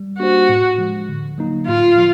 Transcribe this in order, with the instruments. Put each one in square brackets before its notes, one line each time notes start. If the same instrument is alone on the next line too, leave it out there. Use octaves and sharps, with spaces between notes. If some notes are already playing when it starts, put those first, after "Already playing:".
Already playing: [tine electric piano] G3
[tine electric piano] A#3 D4 G4 C5 [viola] F#4
[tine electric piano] A2
F3 G#3
D3
F#3 A#3 D#4
[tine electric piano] A2 [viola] F4
[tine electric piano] F3